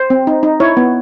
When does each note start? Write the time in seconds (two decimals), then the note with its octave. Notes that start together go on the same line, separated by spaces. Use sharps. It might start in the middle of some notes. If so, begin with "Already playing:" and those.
Already playing: C5
0.10 C4
0.27 D#4
0.43 D#4
0.60 E4 C#5
0.77 B3